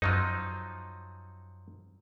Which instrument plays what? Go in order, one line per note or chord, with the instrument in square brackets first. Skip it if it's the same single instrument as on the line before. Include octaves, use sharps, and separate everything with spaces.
[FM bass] F#2 [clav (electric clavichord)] F3 F#3 D#4